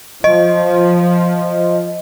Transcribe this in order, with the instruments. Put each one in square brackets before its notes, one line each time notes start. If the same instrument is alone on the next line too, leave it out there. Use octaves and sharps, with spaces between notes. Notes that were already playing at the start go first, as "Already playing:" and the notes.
[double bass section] F3 [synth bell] D#5